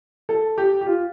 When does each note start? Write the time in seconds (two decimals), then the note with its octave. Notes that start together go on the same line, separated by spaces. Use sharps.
0.29 A4
0.58 G4
0.81 G4
0.86 F4